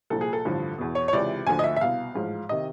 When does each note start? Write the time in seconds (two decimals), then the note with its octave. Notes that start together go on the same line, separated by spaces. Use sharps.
0.10 C2 A#2 F3 A4
0.21 G#4
0.33 A4
0.45 A1 G2 D3 F3
0.78 E2 B2
0.95 C#5
1.08 C#5
1.13 C#2 C3 E3 D5
1.47 D2 D3 F3 G#5
1.59 D#5
1.64 E5
1.76 E5
1.81 C2 B2 F5
2.14 A1 G#2 F3
2.49 C3 D#3 D#5